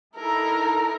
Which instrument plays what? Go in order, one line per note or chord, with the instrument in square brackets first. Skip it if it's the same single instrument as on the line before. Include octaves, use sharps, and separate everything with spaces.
[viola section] D#4 E4 A4 [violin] A#4 [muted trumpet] A#5